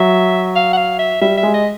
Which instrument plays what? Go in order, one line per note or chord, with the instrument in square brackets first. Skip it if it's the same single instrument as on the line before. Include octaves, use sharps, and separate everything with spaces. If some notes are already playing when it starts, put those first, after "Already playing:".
Already playing: [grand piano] F#3 [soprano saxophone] E5
[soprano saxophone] F5
F#5
F5
E5
[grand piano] G3 [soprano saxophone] E5
[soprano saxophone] E5
[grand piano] G#3
[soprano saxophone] D#5